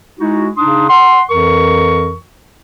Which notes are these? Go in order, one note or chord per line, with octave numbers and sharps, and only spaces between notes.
G#3 D#4 E4 F#4
C#3 D4 D#4 C6 D#6
F#5 C6
F2 E3 A#4 C#6